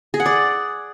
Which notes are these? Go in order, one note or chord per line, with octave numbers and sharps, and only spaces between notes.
G#4
F#5
D5